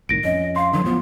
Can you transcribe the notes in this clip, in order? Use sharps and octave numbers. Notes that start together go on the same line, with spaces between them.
C2 A2 D#3 A#6 D7
F2 C#4 D#5
F5 C6
D3 E3 F#3
A1 F3 B3